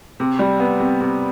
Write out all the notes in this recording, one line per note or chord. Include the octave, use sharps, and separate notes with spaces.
C3
G3
B3
C3
C3